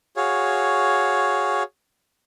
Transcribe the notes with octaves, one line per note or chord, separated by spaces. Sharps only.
F#4 G#4 C#5 F5